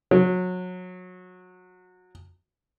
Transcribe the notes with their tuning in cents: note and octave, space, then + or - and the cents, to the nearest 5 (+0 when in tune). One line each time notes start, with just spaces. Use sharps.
F#3 -25